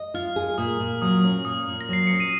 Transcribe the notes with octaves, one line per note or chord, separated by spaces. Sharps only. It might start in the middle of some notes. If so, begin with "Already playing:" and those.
Already playing: D#5
F4 F6
G#4
A#2 D#6
A#2
F#3 D#6
C#4
A#2 D#6
A#2
A#6
F#3 C7
C#4 C#7
D#7